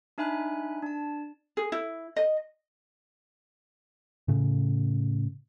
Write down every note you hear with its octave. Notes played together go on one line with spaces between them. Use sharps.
D4 D#4 E5 G#5 B5 F#6
D4 A5
G#4
E4
D#5
A2 C#3